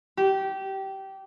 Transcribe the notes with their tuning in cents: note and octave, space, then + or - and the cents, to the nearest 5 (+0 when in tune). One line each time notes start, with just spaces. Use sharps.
G4 -20